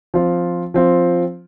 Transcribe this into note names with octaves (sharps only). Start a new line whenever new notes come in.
F3 C4 F4
F3 C4 F4